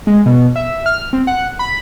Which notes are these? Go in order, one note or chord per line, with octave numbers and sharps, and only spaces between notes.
G#3
B2
E5
F6
C4
F#5
B5